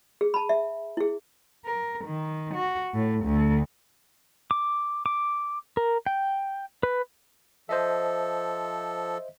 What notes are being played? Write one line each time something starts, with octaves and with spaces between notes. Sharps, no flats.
G#4
A5 B5
E5
E4 G#4
A#4
D#3
F#4
A2
D2
D6
D6
A#4
G5
B4
F3 A4 C5 D#5 E5